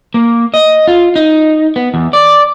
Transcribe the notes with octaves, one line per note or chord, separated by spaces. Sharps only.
A#3
D#5
F4
D#4
B3
E2
D5